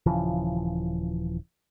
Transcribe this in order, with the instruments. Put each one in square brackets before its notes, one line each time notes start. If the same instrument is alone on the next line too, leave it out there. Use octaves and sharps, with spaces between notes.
[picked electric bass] D#1 C#3 E3 F3